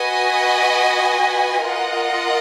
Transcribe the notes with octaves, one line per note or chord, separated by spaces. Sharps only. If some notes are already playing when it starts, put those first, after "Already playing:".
Already playing: F#4 B4 D#5 G#5
F4 A#4 D#5 F#5